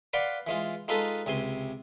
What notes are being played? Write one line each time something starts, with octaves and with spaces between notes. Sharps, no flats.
B4 D5 F5 F#5 C6
E3 G#3 F4
G#3 D#4 F4 A4 B4
C#2 C3 G#5 C6